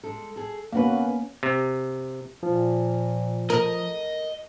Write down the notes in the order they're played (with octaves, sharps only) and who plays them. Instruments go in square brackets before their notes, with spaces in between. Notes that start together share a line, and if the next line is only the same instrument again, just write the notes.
[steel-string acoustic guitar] G#3 A4
G#4 A4
[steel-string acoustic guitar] C#3 F#4 B4 [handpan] A#3 B3 C#4
[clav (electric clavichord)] C3
[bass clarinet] A#2 [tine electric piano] F3
[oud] A#4 [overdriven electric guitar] D#5